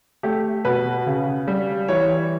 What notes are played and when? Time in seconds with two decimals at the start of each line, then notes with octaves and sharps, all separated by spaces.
0.23 A3 G4
0.65 B2 B4
1.06 C#3
1.48 G3
1.88 E3 C#5